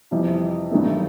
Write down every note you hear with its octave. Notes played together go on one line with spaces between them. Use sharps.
F2 C3 E3 G3
G2 D#3 F#3 A3